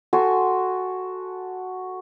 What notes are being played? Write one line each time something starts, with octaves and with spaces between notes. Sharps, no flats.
F#4 A4 G#5 C6